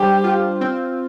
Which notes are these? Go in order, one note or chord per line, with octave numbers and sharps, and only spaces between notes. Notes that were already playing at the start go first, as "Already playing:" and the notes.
Already playing: G3 D4 G4 C5
F4
C4